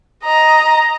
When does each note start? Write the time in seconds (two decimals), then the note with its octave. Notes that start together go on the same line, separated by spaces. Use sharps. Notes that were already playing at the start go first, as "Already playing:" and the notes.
0.24 D#5 A#5